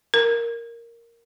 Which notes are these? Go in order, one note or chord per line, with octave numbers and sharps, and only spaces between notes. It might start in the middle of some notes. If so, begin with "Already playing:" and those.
A#4